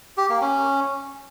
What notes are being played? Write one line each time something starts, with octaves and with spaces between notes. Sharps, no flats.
G4
A#3
C#4